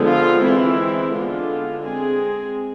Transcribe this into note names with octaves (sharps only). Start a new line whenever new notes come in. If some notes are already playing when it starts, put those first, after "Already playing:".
Already playing: D3 F3 G#3 B3
F4
E3 G#3 C4 E4
D3 G#3 B3 D4 F4
G#3 C4 G#4